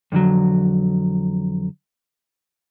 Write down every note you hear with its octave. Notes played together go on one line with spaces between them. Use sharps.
F2 D3 D#3 F#3